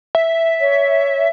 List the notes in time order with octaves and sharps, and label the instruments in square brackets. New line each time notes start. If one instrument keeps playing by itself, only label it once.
[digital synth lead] E5
[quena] C#5